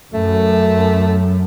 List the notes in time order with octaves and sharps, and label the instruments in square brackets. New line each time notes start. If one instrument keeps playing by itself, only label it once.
[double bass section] F#2 [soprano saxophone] A3